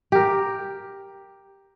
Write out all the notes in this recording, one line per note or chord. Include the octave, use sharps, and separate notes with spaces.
G4 A#4